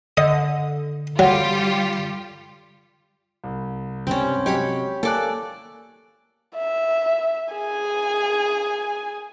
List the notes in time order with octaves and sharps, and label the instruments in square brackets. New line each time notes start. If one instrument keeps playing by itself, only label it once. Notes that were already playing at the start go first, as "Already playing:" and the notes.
[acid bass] D3 [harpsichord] D#5
[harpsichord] F#3 [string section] G3 F4 G4
[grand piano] C2
[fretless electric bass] C#2 G2 G3 [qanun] C4 C#4
[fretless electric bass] C3 F#3 G#3 [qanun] G4 C#5 B5
[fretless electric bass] A#3 [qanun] A4 D5 [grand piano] G#5 D6 F#6
[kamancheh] E5
G#4 G#5